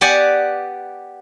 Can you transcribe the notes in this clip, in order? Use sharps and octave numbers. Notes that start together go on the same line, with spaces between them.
B3 G4 D5 F#5 G#5